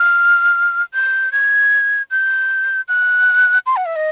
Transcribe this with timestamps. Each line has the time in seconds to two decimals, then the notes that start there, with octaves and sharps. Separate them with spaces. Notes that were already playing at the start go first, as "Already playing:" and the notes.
Already playing: F6
0.94 G6
1.32 G#6
2.11 G6
2.88 F#6
3.66 C6
3.76 F#5
3.85 E5
3.96 D#5